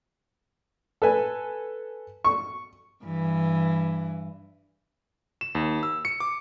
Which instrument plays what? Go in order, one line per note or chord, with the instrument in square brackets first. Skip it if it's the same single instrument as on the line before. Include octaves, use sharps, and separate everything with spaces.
[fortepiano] A4 B4 G#5
C#6
[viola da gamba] G2 E3
[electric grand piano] E7
D#2
E6
C#7
D6